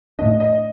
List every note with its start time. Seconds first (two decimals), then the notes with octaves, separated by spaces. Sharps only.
0.19 A2 A3 D4 D#5
0.40 D#5